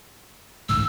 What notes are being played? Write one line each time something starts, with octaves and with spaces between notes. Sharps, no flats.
A1 D2 G#2 E6